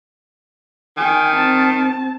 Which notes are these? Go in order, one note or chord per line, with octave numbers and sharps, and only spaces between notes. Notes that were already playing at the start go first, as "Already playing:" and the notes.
D#3 G5 G#5
C4 A5